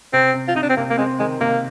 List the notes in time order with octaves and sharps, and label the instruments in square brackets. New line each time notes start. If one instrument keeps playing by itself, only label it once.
[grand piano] C3 [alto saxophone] C4
[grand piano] C3
[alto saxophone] F4
[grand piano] C3 [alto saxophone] D#4
[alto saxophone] D4
C4
[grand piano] C3 [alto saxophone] A#3
[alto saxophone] A#3
[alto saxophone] G#3 [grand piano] C4
[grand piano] D#3 [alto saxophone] G#3
[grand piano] C3 [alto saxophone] A#3